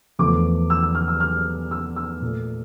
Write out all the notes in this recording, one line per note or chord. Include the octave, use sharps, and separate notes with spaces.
E2 D3 F3 A3 D6
E6
E6
F6
E6
F6
E6
E6
A#2 A3